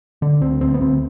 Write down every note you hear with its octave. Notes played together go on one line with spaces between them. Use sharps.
D3 D4
D2 C4
D2 C4
B3
D2 C4